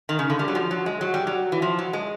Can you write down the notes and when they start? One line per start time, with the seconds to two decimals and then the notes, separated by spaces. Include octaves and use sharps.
0.09 D#3
0.19 C#3
0.30 D3
0.39 G3
0.48 F#3
0.55 F3
0.71 F#3
0.86 G#3
1.01 F#3
1.14 G3
1.27 F#3
1.52 E3
1.62 F3
1.79 F#3
1.93 G#3